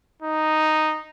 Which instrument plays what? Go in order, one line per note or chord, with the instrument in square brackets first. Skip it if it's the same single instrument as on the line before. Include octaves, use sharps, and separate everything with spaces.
[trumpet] D#4